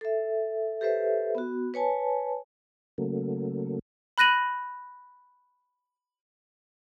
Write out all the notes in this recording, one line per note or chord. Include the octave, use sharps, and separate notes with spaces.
A4 E5
G4 A4 B4 C5 E5
B3 F#4
B4 C#5 G#5 A5
C#3 F#3 A3 A#3
B5 F#6 A#6 D#7 F#7